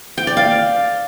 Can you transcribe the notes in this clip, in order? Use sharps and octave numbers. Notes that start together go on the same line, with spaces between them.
G5
D5
F5